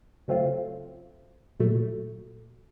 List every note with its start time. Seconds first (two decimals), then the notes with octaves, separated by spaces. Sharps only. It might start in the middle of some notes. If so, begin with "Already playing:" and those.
0.28 C#3 F#3 A3 C4 F4
1.60 A#2 F#3 A3